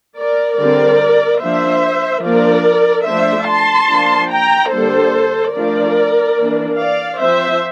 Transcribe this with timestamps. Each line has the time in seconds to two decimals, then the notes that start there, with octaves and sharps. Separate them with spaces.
0.18 A#4 D5
0.60 D3 G3 C4 A#4 D5
1.42 F3 A#3 D4 C5 E5
2.25 F3 A#3 D4 A#4 D5
3.07 F3 A3 D4 C5 E5
3.48 A5 C6
3.90 F3 A#3 D4
4.31 G5 A#5
4.73 D3 G3 A#3 D4 A4 C5
5.55 F3 A3 D4 A#4 D5
6.39 E3 A#3 D4
6.79 D5 F5
7.21 F3 C4 C5 E5